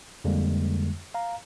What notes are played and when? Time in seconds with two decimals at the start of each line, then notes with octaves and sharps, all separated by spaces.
0.24 F2 D3 G3 G#3 A#3
1.14 F5 A#5